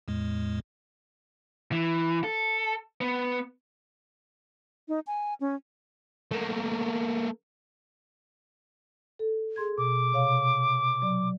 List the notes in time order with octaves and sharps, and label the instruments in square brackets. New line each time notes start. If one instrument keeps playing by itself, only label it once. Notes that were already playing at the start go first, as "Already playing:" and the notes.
[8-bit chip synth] E2 A2 G#3
[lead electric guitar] E3
A4
B3
[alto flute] D#4
G#5
C#4
[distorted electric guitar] A3 A#3
[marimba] A4
G#4 C6 G#6
[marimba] B2 [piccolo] D6
[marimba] C3 C#5 F5
F#3 D5